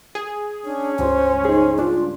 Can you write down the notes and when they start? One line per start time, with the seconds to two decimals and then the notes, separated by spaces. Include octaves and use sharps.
0.15 G#4
0.65 C#4 D4
0.99 C#2 G2 C5
1.45 D#4 G#4 C5
1.79 D4 F4